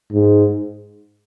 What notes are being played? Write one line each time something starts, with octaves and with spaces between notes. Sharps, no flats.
G#2